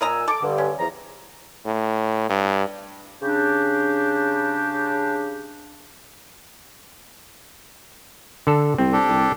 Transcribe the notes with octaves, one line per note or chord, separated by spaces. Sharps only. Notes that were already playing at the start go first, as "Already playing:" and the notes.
A#2 A#4 D#5 G#5 A#5 E6
A4 D6
G2 D3
C#4
E2 F3 A#5
A2
G2
C#3 D4 G4
D3 A4
C2 C4
D4 G4 A4
C2